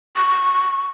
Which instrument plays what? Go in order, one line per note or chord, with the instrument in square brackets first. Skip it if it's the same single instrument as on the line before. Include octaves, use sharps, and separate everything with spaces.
[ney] C#6